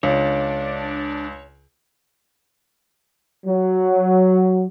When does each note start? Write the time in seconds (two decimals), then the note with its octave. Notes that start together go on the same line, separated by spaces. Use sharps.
0.03 C#2 D4 C#5
3.46 F#3